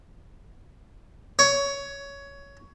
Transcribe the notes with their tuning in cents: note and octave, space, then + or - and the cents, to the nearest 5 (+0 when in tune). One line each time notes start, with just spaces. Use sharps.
C#5 +15